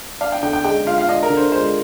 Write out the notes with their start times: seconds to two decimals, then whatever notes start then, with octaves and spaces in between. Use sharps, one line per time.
0.21 D4 F5
0.32 G5
0.43 D3 G5
0.53 G5
0.65 G#3 G5
0.87 F4 F5
0.98 F5
1.08 D4 D#5
1.23 A#4
1.30 D3
1.37 C5
1.52 G#3 C5